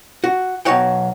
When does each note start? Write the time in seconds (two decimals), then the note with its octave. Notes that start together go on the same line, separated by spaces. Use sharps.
0.24 F#4
0.65 B1 B2 F#3 C#5 F#5 G5